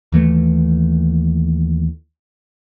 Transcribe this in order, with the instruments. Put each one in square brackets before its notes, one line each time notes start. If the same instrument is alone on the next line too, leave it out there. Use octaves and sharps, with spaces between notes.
[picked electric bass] D#2 E3 A3